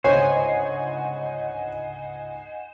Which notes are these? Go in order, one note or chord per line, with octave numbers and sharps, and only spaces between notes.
G1 C#2 G#2 C5 C#5 D#5 F#5 G#5